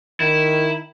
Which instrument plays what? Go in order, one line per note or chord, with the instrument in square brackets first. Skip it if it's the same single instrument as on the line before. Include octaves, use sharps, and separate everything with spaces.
[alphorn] D#3 [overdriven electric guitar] E4